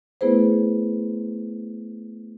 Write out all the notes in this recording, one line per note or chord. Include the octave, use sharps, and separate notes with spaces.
A3 B3 E4 G#4 B4 C5